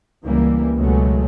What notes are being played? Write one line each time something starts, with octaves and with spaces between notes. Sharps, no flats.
C#2 E3 G3 A#3
C#2 B2 F#3 G#3 A3